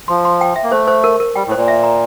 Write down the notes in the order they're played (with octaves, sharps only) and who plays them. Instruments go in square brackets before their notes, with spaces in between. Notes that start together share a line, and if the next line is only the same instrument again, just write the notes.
[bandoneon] F3 [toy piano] C6
[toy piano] C6
G5
E5
[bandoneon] A#3
[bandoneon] A3 [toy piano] C5
[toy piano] C5
A#4
A#4
[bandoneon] G3 [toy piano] G5
[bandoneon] A2
[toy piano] C5
[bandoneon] A#2
[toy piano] E5
A#5